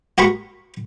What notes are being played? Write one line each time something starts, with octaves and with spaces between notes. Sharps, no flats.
F#4 G4 A#4 B5 C#6